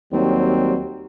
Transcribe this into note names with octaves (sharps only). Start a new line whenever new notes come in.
D#2 F#3 G3 C4